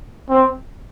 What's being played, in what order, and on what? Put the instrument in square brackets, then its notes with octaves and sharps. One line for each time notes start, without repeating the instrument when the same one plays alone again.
[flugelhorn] C4